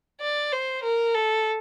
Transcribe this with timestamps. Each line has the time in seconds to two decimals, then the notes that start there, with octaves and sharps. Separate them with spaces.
0.21 D5
0.52 C5
0.84 A#4
1.14 A4